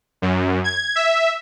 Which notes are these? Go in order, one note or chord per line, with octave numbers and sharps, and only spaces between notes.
F#2
G#6
E5